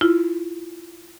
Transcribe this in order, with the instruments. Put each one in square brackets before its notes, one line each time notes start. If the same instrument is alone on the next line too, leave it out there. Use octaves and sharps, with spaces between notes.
[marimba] E4 F4